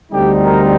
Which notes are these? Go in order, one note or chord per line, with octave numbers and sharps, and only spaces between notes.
D2 D3 G3 C4 D#4 G4
A#4